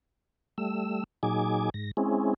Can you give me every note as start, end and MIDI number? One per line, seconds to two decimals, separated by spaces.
0.58 1.04 55
0.58 1.04 57
0.58 1.04 88
1.23 1.70 46
1.23 1.70 54
1.23 1.70 63
1.23 1.70 68
1.23 1.70 80
1.23 1.70 86
1.74 1.91 44
1.74 1.91 94
1.97 2.34 56
1.97 2.34 60
1.97 2.34 61
1.97 2.34 64
1.97 2.34 68